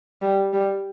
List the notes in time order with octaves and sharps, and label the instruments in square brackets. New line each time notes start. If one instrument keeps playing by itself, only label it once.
[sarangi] G3
G3